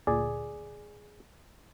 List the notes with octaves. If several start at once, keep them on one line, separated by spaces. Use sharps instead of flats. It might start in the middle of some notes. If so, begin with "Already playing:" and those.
D2 A#2 G#4 D5